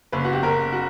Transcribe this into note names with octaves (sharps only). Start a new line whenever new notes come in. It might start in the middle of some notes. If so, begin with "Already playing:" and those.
F#1 B4
F#4
G4
F#1 A#4
F#4